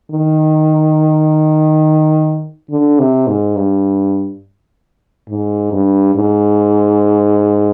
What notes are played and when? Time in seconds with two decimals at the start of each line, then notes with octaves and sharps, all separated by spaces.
0.11 D#3
2.70 D3
2.99 C3
3.28 G#2
3.56 G2
5.29 G#2
5.72 G2
6.15 G#2